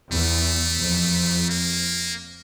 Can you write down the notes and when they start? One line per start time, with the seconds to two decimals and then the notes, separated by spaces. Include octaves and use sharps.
0.12 E2 A3
0.81 F2
1.49 A#3